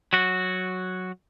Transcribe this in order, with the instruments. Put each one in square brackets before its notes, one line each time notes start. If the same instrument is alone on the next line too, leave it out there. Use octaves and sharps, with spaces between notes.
[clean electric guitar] F#3 F#4